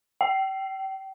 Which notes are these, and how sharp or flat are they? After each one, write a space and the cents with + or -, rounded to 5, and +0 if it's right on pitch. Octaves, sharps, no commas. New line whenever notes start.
G5 -30